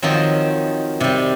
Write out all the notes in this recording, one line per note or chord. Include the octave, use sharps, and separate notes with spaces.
D#3 F3 F#3 C4
C3 G3